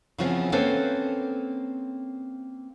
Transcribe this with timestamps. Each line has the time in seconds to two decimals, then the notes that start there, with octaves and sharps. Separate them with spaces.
0.18 C#3 E3 F3 B3 C4
0.52 A#3 C4 C#4 A4 B4 C5